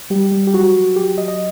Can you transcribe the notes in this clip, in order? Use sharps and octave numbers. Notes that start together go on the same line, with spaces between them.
G3 G4
G3
G4
F#3 F#4
F#3
F#3 G4
F#3 D#5
D#5